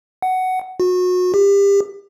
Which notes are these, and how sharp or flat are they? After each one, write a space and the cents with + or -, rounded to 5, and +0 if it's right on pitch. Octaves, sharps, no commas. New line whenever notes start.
F#5 +10
F#4 -30
G4 +30